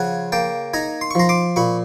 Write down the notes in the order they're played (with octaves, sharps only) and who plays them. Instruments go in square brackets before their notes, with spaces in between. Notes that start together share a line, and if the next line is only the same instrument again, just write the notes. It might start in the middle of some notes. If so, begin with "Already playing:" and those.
Already playing: [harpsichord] C#3 F3 F#5 G#5
A#3 G5 A5
D#4 G#5 A#5
C6
C#6
F3 A#5 C6
C6 D6
A#2 B5 C#6